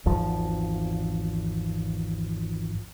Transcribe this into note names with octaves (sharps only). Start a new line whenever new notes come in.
G#1 E2 F3